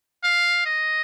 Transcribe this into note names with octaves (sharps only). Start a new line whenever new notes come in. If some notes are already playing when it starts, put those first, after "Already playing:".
F5
D#5